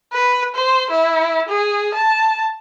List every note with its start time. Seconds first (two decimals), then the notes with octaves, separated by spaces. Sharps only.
0.13 B4
0.55 C5
0.91 E4
1.49 G#4
1.95 A5